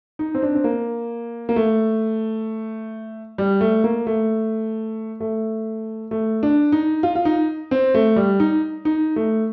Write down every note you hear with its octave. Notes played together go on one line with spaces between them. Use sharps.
D#4
C4
D4
C4
A#3
A#3
A3
G3
A3
A#3
A3
A3
A3
D4
D#4
F4
F4
D#4
C4
A3
G3
D#4
D#4
A3